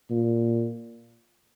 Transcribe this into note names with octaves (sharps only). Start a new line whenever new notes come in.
A#2